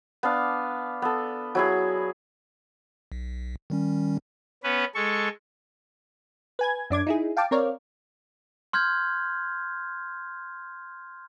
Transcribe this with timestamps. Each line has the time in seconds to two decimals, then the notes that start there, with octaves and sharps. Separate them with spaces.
0.23 B3 D4 F5
1.02 B3 A4
1.55 F#3 E4 G#4
3.12 B1
3.70 D#3 G3 C#4
4.64 B3 C#4 B4
4.95 G#3 A4 C#6
6.59 B4 G#5 G#6
6.90 F#2 D4 D6 G#6
7.07 D#4 E4 G#4
7.37 F5 G5 A5 D6
7.51 C4 A#4 C#5 D5 F5
8.73 C6 F6 G6 G#6